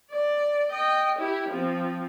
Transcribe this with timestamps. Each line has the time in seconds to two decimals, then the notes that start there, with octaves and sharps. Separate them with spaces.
0.11 D5
0.72 D#5 G5
1.17 E4 G4
1.49 F3 C4